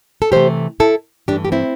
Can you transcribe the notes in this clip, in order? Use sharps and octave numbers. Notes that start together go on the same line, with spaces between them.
A4
C3 E3 A3 G4 C5
E4 A4
G2 E3 A3 D4 G4
G4
C4 E4